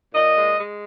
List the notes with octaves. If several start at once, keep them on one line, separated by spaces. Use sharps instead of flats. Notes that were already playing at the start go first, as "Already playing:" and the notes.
A#2 D#5
G#3
G#3